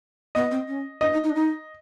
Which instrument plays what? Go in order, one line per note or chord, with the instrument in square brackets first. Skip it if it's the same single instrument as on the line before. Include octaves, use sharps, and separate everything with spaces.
[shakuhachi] B3 [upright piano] D#5
[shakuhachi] C4
C#4
[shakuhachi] D4 [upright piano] D#5
[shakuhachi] D#4
D#4
D4
D#4